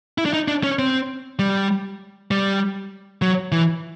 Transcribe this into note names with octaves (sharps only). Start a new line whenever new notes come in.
E4
D4
D#4
D4
C#4
C4
G3
G3
F#3
E3